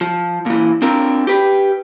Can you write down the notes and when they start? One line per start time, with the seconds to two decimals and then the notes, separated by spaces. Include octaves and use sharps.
0.01 F3
0.46 A#2 E3
0.82 C4 D4 F4 A#4
1.27 G4 B4